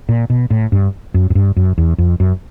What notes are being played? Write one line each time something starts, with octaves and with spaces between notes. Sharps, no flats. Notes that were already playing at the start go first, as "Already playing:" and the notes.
A#2
B2
A2
G2
F#2
F#2
G2
F#2
E2
F2
F#2